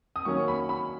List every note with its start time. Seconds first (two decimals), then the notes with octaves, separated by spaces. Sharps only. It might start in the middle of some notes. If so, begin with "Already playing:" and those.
0.16 D#6
0.25 D#3 F#3 A#3 C#4 C#6
0.48 B5
0.69 B5